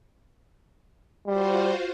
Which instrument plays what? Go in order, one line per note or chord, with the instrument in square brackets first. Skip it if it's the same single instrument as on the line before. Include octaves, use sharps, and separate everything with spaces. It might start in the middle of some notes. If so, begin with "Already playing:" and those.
[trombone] G3 [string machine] F4 F#4 C5